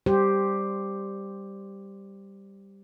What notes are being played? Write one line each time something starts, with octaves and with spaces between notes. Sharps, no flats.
G3 G4 C5